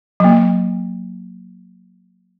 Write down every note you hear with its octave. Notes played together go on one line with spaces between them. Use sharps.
F#3 A#3